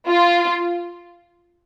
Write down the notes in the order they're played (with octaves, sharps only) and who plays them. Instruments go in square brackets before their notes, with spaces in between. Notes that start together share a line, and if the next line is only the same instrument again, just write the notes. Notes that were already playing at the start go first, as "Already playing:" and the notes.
[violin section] F4